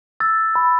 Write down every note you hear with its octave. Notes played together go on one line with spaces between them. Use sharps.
E6 A6
B5